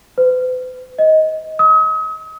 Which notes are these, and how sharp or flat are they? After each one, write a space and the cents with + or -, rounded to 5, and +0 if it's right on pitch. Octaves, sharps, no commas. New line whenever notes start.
B4 +45
D#5 +15
D#6 +40